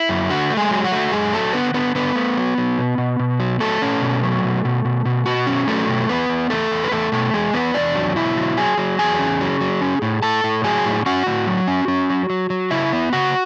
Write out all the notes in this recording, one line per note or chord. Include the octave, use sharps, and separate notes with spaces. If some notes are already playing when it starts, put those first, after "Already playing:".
Already playing: E4
F#2
D3 F#4
A3
G#3 G#4
F#3
F#4
A3
F#2 G#3 G#4
F#3 A3 A4
D3 B3 B4
D3 B3 B4
D3 B3 B4
A3
F#3
F#3
B2
B2
B2
F#3
F#3 A3 A4
C#4
B2
F#3
B2
B2
B2
B2
B2 F#4
C#4
F#3 A3 A4
B2
E2 B3 B4
E2
E2 A3 A4
E2
B4
E2 A3 A4
B2 A3 A4
E2 G#3 G#4
E2 B3 B4
E2 D4 D5
F#3
B2 E4 E5
F#3
F#3 G#4 G#5
F#3
E2 G#4 G#5
C#4
F#3
F#3
C#4
A2
A2 A4 A5
A2
F#3 G#4 G#5
A2
C#4 F#4 F#5
A2
F#3
C#4
C#4
F#3
F#3
F#3
C#3 E4 E5
B3
C#3 F#4 F#5